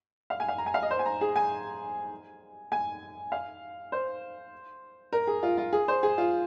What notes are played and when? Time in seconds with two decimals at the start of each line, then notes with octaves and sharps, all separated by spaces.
0.30 F5
0.40 G#5
0.48 F5
0.58 A#5
0.66 G#5
0.74 F5
0.83 D#5
0.91 C5
0.99 G#5
1.06 A#5
1.21 G#4
1.36 G#5
2.72 G#5
3.32 F5
3.92 C5
5.12 A#4
5.27 G#4
5.43 F4
5.58 F4
5.73 G#4
5.88 C5
6.03 G#4
6.18 F4